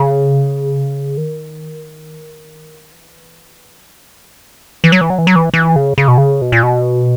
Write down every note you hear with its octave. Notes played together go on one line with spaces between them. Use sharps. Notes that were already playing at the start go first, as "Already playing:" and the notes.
Already playing: C#3
D#3
E3
F#3
E3
F#3
E3
F#3
E3
F#3
E3
F#3
E3
E3
C#3
C#3
B2
C#3
B2
A#2
B2